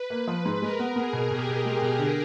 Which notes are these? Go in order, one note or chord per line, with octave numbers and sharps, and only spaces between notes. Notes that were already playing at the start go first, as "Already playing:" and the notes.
Already playing: B4
A#3
F3
G#2
G#3 A#4
B3
B3 G#4
B2
B2 G4
B2
G#3 G#4
B2
D3